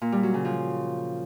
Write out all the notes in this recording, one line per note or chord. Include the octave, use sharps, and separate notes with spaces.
A#2
G3
F#3
C#3
F3